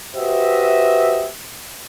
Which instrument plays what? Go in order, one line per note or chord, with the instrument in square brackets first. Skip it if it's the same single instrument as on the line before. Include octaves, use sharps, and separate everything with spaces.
[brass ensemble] F#4 G4 B4 C5 D#5 E5